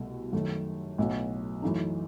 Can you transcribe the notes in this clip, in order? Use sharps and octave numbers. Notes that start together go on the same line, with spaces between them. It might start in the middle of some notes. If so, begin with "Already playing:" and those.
Already playing: C2 B2 A3
F#2 D#3 A3
B1 A2 F#3 B3
F#2 E3 A3 D#4